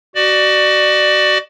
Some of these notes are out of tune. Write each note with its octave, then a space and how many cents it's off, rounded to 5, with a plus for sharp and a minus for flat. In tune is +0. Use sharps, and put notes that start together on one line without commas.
F#4 +25 D5 +25